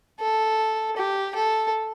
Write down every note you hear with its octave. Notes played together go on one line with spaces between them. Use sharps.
A4
G4
A4